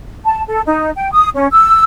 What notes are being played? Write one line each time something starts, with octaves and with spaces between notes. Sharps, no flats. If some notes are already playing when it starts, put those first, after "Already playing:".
A5
A4
D#4
G5
D#6
C#4
E6